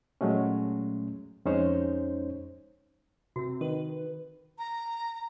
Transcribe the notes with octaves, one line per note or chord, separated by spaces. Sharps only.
A#2 F#3 G#3 A3 C#4
F2 G#3 C#4 D#4 C5 C#5
C3 C4 F#4
D#3 B4
A#5